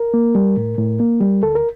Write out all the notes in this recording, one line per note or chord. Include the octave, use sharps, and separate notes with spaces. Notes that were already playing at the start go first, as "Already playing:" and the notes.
Already playing: A#4
A#3
G3
A2
A2
A#3
G3
D2 A4
A#4